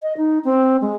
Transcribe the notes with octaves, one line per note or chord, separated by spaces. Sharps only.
D#5
D#4
C4
G#3